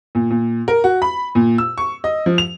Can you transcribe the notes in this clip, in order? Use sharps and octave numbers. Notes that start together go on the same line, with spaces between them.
A#2
A#2
A#4
F#4
B5
A#2
E6
C#6
D#5
F3
F7